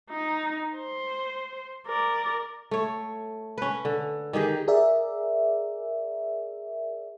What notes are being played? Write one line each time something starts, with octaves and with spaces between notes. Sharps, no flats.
D#4
C5
A#4 D5
A3 C#5
C#4 B4
D3
D#3 D#4 G4 G#4
G#4 A#4 D5 E5